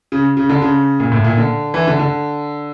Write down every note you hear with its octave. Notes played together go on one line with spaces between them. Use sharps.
C#3
C#3
D3
C#3
A#2
A2
A#2
D3
E3
D3
D3